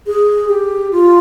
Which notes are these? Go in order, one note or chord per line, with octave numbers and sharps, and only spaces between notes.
G#4
G4
F4